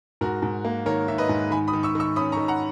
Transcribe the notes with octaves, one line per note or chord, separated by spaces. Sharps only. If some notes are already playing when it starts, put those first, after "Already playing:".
G#2 F#4 A#4
G#2
A#3
D#3 A#4 C#5
D#3 E5
B4 D#5
G#2
D#3 G#5 B5
B5 D#6
D#3
C#6 E6
D#3 C#6 E6
C#4 B5 D#6
A#5 C#6
D#3
F#5 A#5